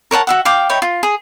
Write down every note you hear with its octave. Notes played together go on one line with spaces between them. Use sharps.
A#4 C#5 F#5 A5
F#4 E5 F#5
F5 G5 D6
D#4 E4 C#5 G5
F4
G#4